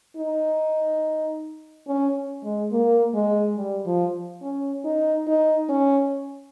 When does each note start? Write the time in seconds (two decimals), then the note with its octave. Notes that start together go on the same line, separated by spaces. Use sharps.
0.17 D#4
1.87 C#4
2.44 G#3
2.72 A#3
3.14 G#3
3.57 G3
3.86 F3
4.42 C#4
4.84 D#4
5.27 D#4
5.69 C#4